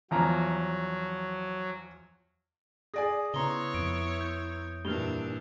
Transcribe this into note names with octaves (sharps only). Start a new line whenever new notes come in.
E2 F3 F#3 A#5
G#4 D5 G#5 D#6 A#6
C#3 B3 E4 C#5 A#5 C6 G7
F2 D7
G6
G2 A#2 E3 D4 F6 F7 G7